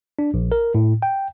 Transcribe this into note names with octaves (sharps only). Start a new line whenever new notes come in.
D4
A#1
A#4
A2
G5